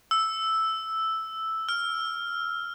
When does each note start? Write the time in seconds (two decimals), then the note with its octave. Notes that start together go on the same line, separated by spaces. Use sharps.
0.11 E6
1.69 F6